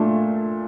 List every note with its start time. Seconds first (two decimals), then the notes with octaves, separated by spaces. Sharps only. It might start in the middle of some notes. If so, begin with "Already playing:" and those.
Already playing: A#2 A3 D4